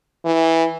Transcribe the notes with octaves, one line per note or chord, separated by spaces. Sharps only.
E3